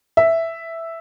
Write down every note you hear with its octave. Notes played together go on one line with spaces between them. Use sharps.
E5